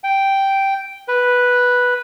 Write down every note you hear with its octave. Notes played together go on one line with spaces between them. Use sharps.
G5
B4